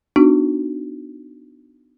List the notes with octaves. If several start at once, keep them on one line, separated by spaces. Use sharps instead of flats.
B3 D4 D#4 F#4